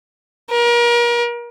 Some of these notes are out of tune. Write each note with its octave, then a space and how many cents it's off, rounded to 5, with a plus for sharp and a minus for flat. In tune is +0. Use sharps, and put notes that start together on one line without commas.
A#4 +35